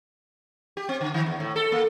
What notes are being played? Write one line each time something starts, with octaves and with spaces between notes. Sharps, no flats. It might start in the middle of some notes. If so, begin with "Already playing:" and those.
G4
C4
D3
D#3
E2
A2
A4
A#3